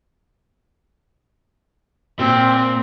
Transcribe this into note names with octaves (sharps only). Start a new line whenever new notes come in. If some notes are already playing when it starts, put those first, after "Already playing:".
A#2 C4